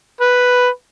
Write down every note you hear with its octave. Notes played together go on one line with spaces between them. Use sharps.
B4